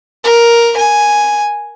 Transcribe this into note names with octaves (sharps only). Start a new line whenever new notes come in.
A#4
G#5